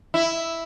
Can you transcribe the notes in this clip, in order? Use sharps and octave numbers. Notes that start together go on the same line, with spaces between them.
E4